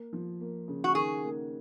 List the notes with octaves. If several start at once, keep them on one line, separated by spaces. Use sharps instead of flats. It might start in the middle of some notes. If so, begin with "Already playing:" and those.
Already playing: A#3
F3
A#3
C#3
F#4
D#3 G#4
A#3